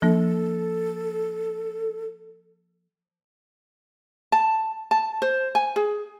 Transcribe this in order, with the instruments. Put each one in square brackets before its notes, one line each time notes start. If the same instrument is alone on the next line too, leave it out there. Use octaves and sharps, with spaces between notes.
[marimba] F3 A#3 D4 [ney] A4
[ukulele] A5
A5
C5
G#5
G#4